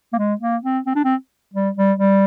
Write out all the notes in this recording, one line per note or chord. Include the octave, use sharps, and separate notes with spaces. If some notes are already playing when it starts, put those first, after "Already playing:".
A#3
G#3
A#3
C4
C4
D4
C4
G3
G3
G3